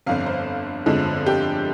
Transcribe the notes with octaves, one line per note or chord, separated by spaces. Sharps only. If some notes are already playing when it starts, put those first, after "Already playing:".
G1 F2 D3 F5
C5
G1 F2 D3 F3 G#3
G4